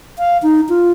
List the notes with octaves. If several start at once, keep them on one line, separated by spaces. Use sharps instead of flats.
F5
D#4
F4